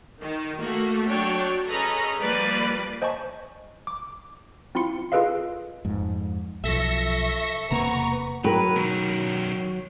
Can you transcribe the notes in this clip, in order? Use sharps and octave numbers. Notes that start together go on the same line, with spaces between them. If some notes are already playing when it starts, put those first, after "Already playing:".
D#3
A3 A#3 F#4
F#3 D4 C#5 G5
C#4 G#4 A4 B4 D#5 A#5
F3 G3 A#3 B4 D5
C5 D#5 G#5 A5 C#6
D6
C4 E4 F4 C6 C#7
F4 G#4 A4 B4 D#5 F5
F2 G#2
B1 F3 A4 E5 C#6 A#6
E1 C3 A#3 B3 A#5 C#6
F#3 A#4 B4 G5
B2 D#3